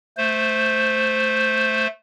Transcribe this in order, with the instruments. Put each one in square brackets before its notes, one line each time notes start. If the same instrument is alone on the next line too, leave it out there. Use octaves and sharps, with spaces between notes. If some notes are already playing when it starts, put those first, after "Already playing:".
[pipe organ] A3 C5